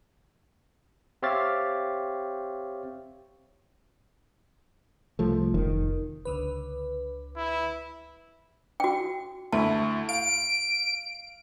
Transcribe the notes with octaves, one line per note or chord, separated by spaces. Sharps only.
C4 G4 C#5 E5 F5 A6
C2 F3 A3
F1 D#3
C#2 D3 B4
E4
F#4 G5
D2 E4 A5 B5
F5 D7